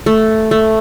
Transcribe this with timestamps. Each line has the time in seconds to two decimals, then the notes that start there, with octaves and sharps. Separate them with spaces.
0.06 A3
0.51 A3